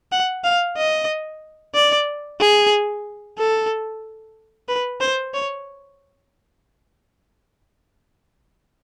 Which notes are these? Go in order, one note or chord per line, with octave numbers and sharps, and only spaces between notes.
F#5
F5
D#5
D5
G#4
A4
B4
C5
C#5